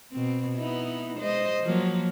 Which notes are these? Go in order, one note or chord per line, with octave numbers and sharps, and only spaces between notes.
B2 C4
B3 D#4 E4
G#3 C5 D#5
F3 F#3 A#3